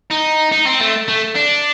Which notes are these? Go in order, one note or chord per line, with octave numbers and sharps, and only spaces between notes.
D#4
D#4
C4
A3
A3
D4